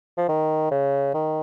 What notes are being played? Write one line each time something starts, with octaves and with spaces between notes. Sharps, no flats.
F3
D#3
C#3
D#3